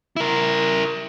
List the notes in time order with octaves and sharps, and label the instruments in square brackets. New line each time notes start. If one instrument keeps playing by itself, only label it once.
[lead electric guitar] E4 A#4